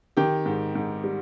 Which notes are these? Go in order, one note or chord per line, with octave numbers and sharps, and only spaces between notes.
D#3 G4 G5
G#2
G#2
G3